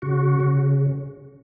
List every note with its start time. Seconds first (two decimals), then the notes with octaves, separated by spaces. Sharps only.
0.02 C#3 F#4
0.40 C#3